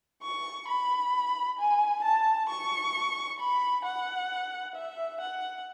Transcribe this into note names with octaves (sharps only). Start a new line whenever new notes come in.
C#6
B5
G#5
A5
C#6
B5
F#5
E5
F#5